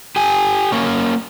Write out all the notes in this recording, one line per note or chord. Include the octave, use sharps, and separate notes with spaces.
G4 G#5
A#3 C#4